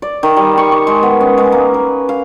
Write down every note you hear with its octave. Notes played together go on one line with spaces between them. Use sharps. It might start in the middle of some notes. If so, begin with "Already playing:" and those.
D5
D#3
G3
C#6
C#6
G#3
B3
C#4
G#3
A#3
B4
F5